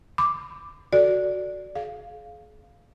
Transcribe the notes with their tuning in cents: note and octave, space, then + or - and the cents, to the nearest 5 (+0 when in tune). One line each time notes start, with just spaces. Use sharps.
B5 +35 D6 +0
F#4 +0 A4 +0 D5 +0
G#4 +35 F5 +0